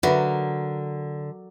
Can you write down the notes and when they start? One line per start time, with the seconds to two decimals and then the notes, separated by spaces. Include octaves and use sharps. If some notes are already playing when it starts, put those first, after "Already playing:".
0.03 D3 F#3 A#4 B4 E5 B5